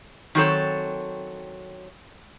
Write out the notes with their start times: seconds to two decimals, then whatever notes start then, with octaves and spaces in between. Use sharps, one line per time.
0.35 D#3 F#3 C4 A4 C#5